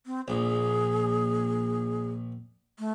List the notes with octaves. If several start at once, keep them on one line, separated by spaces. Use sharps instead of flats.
C4
A#1 G#4
A3